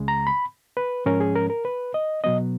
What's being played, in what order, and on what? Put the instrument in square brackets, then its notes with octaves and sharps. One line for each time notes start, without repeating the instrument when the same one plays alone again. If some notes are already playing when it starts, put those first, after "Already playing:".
Already playing: [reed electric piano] C#2 C#3 G#3
A#5
B5
B4
G#2 F3 G#3 C#4 A#4
G#4
A#4
A#4
B4
D#5
B2 F#3 B3 D#5